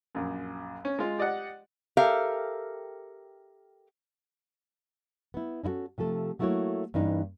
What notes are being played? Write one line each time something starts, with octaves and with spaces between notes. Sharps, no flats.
A#1 F#2
C#4
G#3 F4
G4 D5 D#5 F#5
G4 A4 A#4 E5 F5
B3 E4
C#4 D#4 E4 F#4 A4
C3 F3 A3 A4
F#3 A3 A#3 E4 F#4 C#5
G2 E3 A#3 C#4 D#4